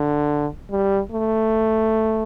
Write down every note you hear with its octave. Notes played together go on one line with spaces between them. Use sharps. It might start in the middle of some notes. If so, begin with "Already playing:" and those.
Already playing: D3
G3
A3